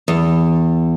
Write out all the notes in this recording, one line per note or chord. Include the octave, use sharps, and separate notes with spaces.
E2